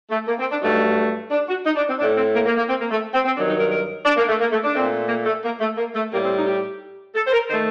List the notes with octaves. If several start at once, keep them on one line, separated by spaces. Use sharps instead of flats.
A3
A#3
C4
D4
G2 F#3 A3 D#4
D4
F#4
D#4
D4
C4
A2 A3 D4
C4
A#3
A#3
A#3
C4
A#3
A3
C4
C4
G2 D#3 F#3 D4
D#4
A#4
A#4
D4
A#3
A3
A#3
A3
D4
A#2 A3 C4
A#3
A3
A#3
A3
A#3
A3
A2 G3 A#3
C4
D#4
G4
A4
C5
A#4
D#3 A3 C5